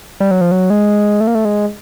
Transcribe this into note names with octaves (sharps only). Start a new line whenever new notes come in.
G3
F#3
F3
F#3
G#3
A3
A#3
A3
G#3